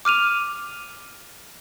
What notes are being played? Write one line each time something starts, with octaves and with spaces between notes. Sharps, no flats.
D6 F6 D#7 F7